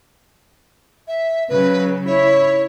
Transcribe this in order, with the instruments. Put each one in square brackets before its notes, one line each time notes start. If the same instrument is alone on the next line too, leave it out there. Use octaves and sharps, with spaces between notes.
[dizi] E5
[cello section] C#3 F#3 [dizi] B4
[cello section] E4 [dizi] C#5